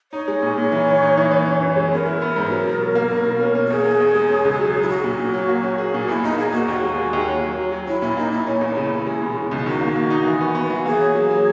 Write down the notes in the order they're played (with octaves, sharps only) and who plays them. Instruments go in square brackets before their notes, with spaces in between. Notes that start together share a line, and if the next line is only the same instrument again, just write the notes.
[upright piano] D#4 [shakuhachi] C#5
[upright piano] G#3
A#2
A#2
E3
E3
D#4
E3
E3
F#2
F#2
G#3
[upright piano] B3 [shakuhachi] A#4
[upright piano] E4
B3
G#2
F#3
B2
F#3
A#3
B2
B2
C#4
C#4
[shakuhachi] F#4
[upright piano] E2 [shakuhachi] G#4
[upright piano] E2
E2
G#3
C#4
C#2
F#3
F#3
[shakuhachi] E4
[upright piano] F#3 [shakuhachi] F#4
[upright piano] A#2
A#2
F#3
A#3
C#4
G#4
A#2
[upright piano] E2 [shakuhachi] E4
[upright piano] E2 [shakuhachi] D#4
[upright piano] A#3 [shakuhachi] G#4
[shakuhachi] E4
[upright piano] A#3 [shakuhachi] F#4
[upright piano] D#2 [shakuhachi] F#4
[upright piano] G#3
G#3
D#2
C#4
F#3
F#3
F#3
[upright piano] C#4 [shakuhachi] E4
[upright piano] A#2 [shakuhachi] E4
[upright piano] A#3 [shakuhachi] D#4
[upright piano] A#2 [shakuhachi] E4
[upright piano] C#4 [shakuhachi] E4
[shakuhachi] D#4
[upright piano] E2 [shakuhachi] E4
[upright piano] C#3
E2
G#3
B2
B2
C#2
[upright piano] D#3 [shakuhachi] F#4
[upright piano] A#3
A#3
D#4
E3
B3
B3
E3
[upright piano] A#3 [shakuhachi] G#4
[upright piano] C#4
F#3
F#3